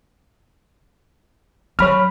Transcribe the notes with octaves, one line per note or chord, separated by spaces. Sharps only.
F#3 C#5 B5 F6